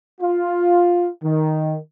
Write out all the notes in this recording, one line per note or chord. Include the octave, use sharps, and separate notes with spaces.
F4
D#3